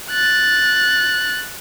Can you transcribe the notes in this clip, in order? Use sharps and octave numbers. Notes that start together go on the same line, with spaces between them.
F#6 A6